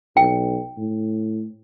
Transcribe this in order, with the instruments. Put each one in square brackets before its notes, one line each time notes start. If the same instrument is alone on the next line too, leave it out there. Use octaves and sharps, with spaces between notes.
[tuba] B1 [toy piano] G5
[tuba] A2